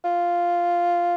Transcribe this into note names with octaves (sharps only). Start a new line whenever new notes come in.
F4